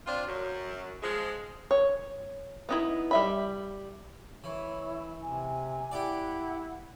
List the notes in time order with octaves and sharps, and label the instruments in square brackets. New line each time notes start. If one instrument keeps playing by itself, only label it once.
[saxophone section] C4 D4 F4
F#2
F3 G#3
[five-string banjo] C#5
B3 D#4 E4
G3 E5 B5
[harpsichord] E3 [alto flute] E4 [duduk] C#5
[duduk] C3 [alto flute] G#5
[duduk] E4 [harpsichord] G4 D5 [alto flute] F#5